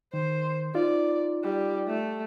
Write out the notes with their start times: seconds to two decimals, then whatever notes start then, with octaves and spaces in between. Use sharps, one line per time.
0.14 D#3 C5
0.75 D#4 F4 D5
1.43 G3
1.88 A3